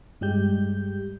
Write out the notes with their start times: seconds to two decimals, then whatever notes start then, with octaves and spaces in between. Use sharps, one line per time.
0.21 G2 G3 G#3 G4 G6